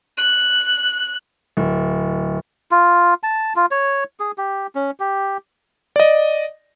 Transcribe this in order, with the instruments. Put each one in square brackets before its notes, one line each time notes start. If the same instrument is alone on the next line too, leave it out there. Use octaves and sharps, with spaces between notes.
[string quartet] F#6
[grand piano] D1
[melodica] F4
A5
F4
C#5
G#4
G4
C#4
G4
[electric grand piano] D5 D#5